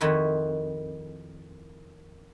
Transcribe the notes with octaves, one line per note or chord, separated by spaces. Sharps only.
F2 D#3 E4 F#4 B4